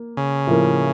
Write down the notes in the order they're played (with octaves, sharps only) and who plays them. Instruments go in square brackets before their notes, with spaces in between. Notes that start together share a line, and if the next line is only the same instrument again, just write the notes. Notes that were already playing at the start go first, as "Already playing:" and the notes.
Already playing: [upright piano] A#3
[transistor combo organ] C#3
[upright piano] A2 F3 A#3